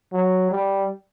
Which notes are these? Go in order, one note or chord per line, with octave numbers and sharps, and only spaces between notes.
F#3
G3